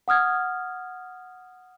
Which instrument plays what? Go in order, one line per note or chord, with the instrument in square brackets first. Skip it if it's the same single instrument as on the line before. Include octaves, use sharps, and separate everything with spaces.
[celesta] F#5 D#6 F6 G#6